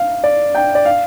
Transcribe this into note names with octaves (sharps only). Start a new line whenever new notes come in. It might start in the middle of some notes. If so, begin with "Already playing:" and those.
Already playing: F5
D5
G5
D5
F5